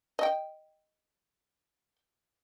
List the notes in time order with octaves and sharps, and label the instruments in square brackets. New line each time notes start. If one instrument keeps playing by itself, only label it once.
[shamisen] D#5 G5